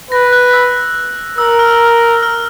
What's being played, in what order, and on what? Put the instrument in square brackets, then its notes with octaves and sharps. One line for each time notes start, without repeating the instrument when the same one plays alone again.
[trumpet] B4 [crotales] A#6
[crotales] F#6
E6
[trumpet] A#4 [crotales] E6
[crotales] F6
F6